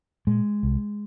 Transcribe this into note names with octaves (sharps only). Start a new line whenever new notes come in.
A#2 G#3
C2